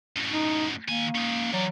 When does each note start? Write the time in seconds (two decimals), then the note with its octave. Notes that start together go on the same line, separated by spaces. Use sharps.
0.16 F#2 A2
0.32 D#4
0.88 D#3 A#3 G#5
1.15 C#4 D#4
1.53 E3 F#3 D5